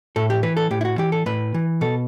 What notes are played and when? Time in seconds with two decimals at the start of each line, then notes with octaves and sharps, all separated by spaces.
0.16 A2 A4
0.30 G4
0.43 E3 B4
0.57 A4
0.71 A2 G4
0.81 E4
0.85 F#4
0.98 E3 G4
1.12 A4
1.26 A2 B4
1.54 E3
1.81 B2 A4